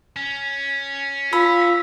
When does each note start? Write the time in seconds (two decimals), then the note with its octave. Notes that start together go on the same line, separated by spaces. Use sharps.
0.16 C#4
1.33 F4 B5 E6